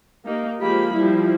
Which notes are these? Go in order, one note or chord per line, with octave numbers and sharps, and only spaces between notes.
A#3 D#4 G4
F3 G#3 A#3 G4 B5
F3 G3 E4